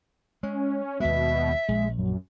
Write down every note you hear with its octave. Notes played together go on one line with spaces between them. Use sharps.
G#3 C#4
D#2 B2 G#3 E5
A#1 G#3
F#2